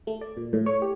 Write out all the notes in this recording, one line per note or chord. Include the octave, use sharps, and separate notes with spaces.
A3
D5
A#2
A2
C#5
G4